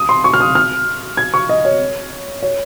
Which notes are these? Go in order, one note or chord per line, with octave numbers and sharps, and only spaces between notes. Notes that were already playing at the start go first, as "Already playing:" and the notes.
Already playing: D#6
C6
C#6
F6
D#6
F6
G#6
C#6
D#5
C#5
C#5